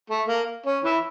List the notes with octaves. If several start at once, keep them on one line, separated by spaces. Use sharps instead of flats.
A3
A#3
C#4
E3 E4